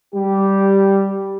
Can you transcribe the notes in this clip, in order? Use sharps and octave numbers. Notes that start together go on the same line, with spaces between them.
G3 G4